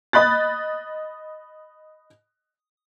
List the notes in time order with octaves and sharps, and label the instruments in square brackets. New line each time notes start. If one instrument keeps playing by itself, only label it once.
[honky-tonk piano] D#5 B5 F#6 A6